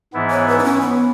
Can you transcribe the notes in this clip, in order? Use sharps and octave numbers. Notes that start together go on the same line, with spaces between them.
G#2 E3 B3 E4
C#5
B4
D#4
C#4
B3